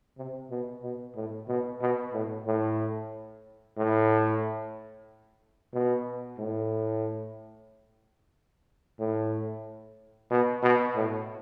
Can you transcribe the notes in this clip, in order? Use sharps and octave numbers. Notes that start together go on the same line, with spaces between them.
C3
B2
B2
A2
B2
B2
A2
A2
A2
B2
A2
A2
B2
B2
A2